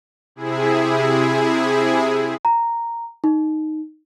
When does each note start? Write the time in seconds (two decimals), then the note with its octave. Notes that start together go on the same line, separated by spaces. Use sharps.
0.36 C3 E4 G#4
2.45 A#5
3.24 D#4